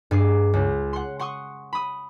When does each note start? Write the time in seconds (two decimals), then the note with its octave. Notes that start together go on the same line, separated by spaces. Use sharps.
0.11 G2 G#4 D6 C7
0.53 C#2
0.93 F#5 C6
1.19 F#5 C6 C#6 D#6
1.73 B5 D#6